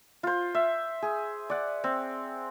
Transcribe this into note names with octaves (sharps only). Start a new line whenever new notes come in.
F4 C5
E5
G#4
D5 F#5
C4